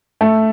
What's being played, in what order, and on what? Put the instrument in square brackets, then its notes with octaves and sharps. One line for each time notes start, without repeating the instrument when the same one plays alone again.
[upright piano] A3